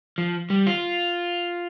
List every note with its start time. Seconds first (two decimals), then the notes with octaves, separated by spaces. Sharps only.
0.18 F3
0.50 G3
0.67 F4